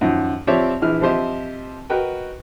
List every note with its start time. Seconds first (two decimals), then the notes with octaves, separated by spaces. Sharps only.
0.01 F#2 D#3 F3
0.47 F3 C4 G4 C#5 D5 E5
0.82 A#1 E3 E4 F6
1.01 F3 C4 G4 C5 D#5 E5
1.90 F#4 A#4 B4 D#5 G5